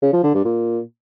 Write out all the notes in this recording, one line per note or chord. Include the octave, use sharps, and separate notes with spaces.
C#3
F3
D3
G2
A#2